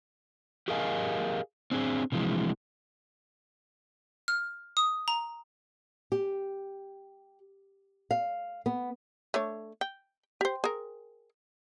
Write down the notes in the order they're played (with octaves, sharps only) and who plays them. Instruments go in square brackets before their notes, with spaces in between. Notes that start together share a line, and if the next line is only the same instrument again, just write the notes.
[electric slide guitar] G4 G#4 A#4 D#5 F5 G#5
C4 D4 G#4
C3 E3 F3 G#3
[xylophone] F6
D#6
A#5
[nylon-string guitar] G4
F5
B3
[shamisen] A3 D4 C#5
G5
G4 C5
G#4 A#4